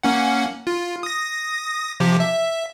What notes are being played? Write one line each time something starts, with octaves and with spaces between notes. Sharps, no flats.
A#3 C#4 F#5
F4
D#6 A#6
C3 F3 G4
E5